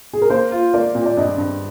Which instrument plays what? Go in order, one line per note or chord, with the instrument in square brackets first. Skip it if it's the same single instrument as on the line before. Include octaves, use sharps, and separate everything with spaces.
[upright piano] G#4
A#4
[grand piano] A#3 [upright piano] C5
[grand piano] F4
[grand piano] A#3 [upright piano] D5
[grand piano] A#2
[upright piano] D5
[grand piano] G2 [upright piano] D#5
[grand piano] G2